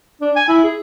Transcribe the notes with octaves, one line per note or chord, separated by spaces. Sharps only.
D4
G#5
E4
G#4